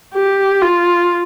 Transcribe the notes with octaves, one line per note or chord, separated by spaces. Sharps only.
G4
F4